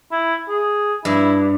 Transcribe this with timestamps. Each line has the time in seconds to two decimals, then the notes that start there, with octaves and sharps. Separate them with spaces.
0.12 E4
0.49 G#4
1.05 G2 E4